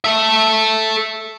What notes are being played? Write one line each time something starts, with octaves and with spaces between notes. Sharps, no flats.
A4 E5